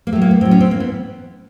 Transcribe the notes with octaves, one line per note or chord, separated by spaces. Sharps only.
A#3
A2 F#3 A3
A#3
B3
A2 F#3 C4
C#4
C4
G#2 E3 A#3
B3